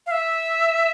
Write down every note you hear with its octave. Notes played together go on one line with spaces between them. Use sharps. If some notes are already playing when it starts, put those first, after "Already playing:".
F5
E5